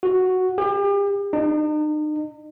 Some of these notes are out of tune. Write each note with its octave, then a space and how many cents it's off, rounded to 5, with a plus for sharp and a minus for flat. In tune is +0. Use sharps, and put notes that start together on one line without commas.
F#4 +0
G4 +40
D#4 -40